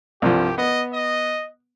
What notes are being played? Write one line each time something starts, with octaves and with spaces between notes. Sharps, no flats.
C2 G2 F3 G4
B3 D#5
D#5